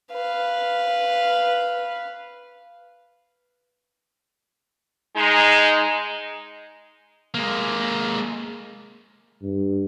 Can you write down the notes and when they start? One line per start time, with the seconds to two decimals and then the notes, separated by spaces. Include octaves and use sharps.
0.13 B4 F5
5.16 G#3 D#4
7.35 G#3 A#3
9.43 G2